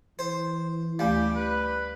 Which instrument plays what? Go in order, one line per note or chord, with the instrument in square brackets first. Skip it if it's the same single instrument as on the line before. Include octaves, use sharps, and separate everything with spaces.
[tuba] E3 [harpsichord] C5
[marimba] D2 A3 F5 [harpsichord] G3 [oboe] G4
[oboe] B4